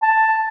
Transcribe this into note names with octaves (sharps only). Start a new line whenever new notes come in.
A5